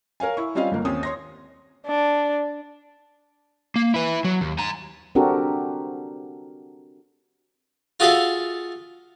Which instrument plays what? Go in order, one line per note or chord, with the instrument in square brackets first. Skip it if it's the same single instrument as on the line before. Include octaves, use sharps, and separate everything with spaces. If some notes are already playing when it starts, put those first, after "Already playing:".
[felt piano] A#4 C#5 F5 G#5
E4 C#6
G3 C4 C#4 F4 D#5 F5
G1 A#3
D#2 C4 C#4 D#6
C#5 C6 A#6
[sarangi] D4
[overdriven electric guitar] A#3
E4 B4
F#3
D#2
G#5 A#5
[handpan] C4 D4 F#4 G4 A4 A#4
[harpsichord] F4 F#4 G#4 A4 E5 F5